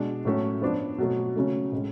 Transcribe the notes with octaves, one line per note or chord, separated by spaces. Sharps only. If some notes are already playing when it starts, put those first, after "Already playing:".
Already playing: B2 G#3 D4
A2 F#3 A3 C#4
F3 B3 D4
B2 F#3 A3
C#3 F#3 A3 C#4
A2 G#3 C#4